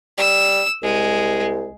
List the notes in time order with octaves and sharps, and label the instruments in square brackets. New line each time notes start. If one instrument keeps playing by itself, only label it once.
[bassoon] G3 [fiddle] E6
[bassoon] C2 [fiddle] G#3